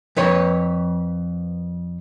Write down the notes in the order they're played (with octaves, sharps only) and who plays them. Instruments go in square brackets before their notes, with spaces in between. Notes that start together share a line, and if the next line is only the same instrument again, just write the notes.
[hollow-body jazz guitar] F2 B4 C#5